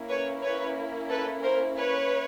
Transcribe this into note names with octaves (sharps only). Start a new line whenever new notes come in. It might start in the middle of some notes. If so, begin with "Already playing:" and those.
Already playing: A#3 C#4 E4
B4 C#5
B4 C#5
A4 B4
A#4 C5
B4 C#5